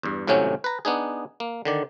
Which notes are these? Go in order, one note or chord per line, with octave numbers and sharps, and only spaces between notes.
E2 G2
G#1 A2 C3 F#3 C#4
B4 A#5
B3 D4 D#4 G#4
A#3
D3 D#3 D5